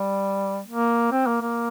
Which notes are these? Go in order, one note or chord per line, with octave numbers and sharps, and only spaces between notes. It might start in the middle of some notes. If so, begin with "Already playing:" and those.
Already playing: G3
A#3
C4
A#3
A#3